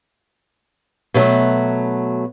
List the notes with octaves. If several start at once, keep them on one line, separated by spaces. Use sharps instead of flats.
B2 F#3 A3